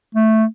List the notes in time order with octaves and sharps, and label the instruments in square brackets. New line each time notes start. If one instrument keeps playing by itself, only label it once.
[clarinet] A3